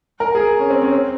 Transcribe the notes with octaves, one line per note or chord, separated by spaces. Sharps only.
A#4
G#4
C#4
C4
C#4
C4